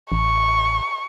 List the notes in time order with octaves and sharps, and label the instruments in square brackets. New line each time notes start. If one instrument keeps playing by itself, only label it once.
[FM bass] A1 [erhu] C#6